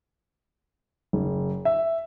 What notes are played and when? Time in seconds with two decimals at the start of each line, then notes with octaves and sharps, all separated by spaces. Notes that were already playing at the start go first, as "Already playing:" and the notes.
1.13 F#1
1.65 E5